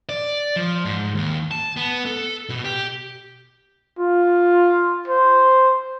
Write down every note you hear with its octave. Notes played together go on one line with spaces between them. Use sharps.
D5
F3
G#2
D#2
A5
B3
A4
B2
G4
F4
C5